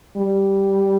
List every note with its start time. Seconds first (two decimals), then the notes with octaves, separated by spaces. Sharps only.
0.17 G3